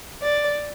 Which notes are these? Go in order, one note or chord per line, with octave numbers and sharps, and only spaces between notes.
D5